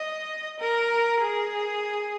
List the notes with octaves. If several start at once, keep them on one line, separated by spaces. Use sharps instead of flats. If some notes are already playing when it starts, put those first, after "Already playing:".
Already playing: D#5
A#4
G#4